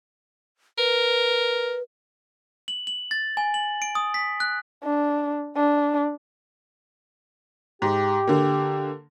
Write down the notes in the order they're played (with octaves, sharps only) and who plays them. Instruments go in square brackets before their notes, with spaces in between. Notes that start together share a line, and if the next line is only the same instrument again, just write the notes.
[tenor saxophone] A#4 [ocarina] B4
[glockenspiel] F#7
F#7
A6
G#5
F#7
D7
D#6
B6
F#6
[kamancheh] D4
D4
[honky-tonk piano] G#2 [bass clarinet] G4
[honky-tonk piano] D3 A#3